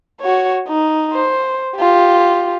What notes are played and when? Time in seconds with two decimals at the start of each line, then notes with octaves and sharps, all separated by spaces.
0.21 F#4 C#5
0.68 D#4
1.14 C5
1.76 F4 G4